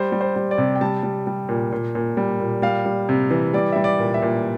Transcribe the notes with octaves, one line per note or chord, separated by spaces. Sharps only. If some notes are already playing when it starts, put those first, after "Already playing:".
Already playing: G3 C5
G3
C5
G3
D5
C3
G5
G3 A5
G3
G3
A#2
A#2
A#2
G3
A#2
G3 F5
G3
C3
E3
G3 D5
G3 E5
D5
A#2
E5
A#2